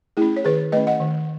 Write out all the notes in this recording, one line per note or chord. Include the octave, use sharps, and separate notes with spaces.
A3 C#4 E4 G#4
C#5
D#3 G#4 B4
A3 C#4 B4 D#5
D#5 F#5
D#3